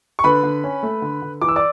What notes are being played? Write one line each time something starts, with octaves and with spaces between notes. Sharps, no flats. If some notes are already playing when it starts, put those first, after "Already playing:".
C#6
D3 B4 B5
D3
C#4
A3
D3
D3
E3 D6
E6
D5 D6